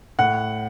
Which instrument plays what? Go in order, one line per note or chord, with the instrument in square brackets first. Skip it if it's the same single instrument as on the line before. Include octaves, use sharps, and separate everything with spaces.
[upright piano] A2 F#5